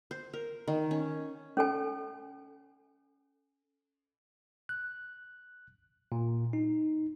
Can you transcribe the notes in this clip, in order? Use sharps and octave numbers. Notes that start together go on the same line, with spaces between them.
C5
A#4
D#3
C#4
C#4 A4 G#5
F#6
A#2
D#4